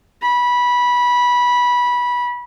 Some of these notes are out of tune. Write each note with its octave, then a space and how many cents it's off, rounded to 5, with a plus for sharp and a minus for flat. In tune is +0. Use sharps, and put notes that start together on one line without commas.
B5 -15